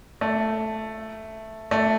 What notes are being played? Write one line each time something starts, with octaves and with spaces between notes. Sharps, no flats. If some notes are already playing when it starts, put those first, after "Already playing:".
A3
A3